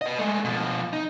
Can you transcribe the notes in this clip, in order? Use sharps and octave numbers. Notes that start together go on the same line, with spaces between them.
B4 D#5
G#3 A3
B2 F3
D#4